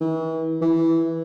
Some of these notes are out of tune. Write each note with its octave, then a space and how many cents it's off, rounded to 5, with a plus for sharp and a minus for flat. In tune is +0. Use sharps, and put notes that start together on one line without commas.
E3 -35
E3 -5